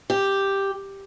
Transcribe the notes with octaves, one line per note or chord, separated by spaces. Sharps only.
G4